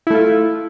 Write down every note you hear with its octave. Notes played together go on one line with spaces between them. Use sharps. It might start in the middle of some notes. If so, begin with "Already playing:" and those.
A3 E4 F4